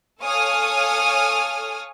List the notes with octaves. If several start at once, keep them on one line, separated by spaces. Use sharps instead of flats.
A4 C#5 F5 G#5 D#6 F6